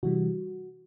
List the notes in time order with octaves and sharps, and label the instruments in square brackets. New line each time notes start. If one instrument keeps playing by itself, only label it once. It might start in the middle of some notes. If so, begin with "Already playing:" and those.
[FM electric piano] C3 E3 G3 F#4